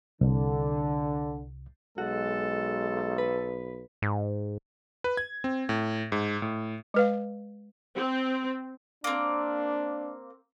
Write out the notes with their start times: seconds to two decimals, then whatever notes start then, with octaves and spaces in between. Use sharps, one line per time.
0.21 C2 D3
1.98 B1 G#3 F#4 A4
3.18 B4
4.02 G#2
5.04 B4
5.17 G#6
5.44 C4
5.69 A2
6.12 G#2
6.42 A2
6.94 G#3 B4 F5
7.96 C4
9.04 A#3 C4 D4